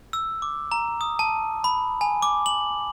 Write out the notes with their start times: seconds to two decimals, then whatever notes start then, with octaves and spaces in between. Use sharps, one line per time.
0.13 E6
0.42 D6
0.72 A#5
1.01 D#6
1.19 A5
1.64 B5
2.01 G#5
2.22 D6
2.46 F#7